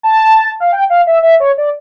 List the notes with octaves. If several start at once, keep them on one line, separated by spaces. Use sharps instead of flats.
A5
F5
G5
F5
E5
E5
C#5
D5